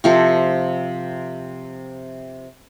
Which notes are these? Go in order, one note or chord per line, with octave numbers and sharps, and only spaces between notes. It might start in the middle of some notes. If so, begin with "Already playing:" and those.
C3 F3 A4